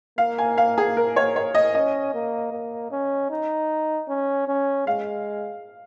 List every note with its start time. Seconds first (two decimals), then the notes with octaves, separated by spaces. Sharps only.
0.18 A#3 F5
0.38 G#5
0.58 F5
0.78 G#4
0.97 A#4
1.16 C#5
1.36 C#5
1.55 D#5
1.75 C#4 D#5
2.14 A#3
2.52 A#3
2.91 C#4
3.31 D#4
4.09 C#4
4.48 C#4
4.87 G#3 F5